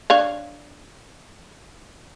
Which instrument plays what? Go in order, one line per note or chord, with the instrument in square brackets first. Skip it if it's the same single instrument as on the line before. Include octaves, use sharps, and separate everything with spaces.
[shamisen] D4 C#5 F5